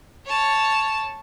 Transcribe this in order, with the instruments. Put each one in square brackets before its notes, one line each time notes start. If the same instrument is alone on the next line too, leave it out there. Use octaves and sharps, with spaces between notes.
[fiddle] C#5 A5